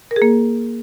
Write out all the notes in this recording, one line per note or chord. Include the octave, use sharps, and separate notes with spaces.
A#4
G#4
A#3